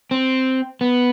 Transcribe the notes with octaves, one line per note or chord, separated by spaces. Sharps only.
C4
B3